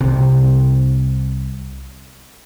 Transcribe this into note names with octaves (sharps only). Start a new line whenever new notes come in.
C2 C3